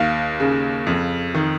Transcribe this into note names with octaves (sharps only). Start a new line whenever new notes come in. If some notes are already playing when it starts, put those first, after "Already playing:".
Already playing: D#2 F5
C#3
F2
D#3